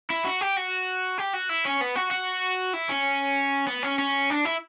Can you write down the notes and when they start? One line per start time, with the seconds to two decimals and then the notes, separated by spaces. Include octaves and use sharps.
0.10 E4
0.25 F#4
0.41 G4
0.57 F#4
1.18 G4
1.33 F#4
1.49 E4
1.65 C#4
1.81 B3
1.96 F#4
2.11 F#4
2.74 E4
2.89 C#4
3.67 B3
3.83 C#4
3.98 C#4
4.30 D4
4.45 E4